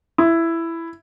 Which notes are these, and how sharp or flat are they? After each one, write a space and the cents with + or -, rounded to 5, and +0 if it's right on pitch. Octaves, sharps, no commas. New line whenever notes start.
E4 +10